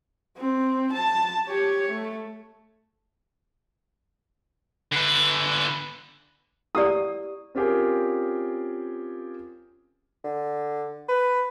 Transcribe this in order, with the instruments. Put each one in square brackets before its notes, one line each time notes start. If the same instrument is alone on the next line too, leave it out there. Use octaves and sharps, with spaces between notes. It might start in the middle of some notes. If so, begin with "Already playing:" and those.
[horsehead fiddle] C4
A5
G4 C#5
A3
[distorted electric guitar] D3 B4
[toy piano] E4 G4 D5 [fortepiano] D#6
[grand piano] C4 C#4 F4 G4 G#4 A#4
[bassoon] D3
B4